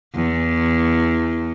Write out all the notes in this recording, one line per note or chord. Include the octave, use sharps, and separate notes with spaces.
E2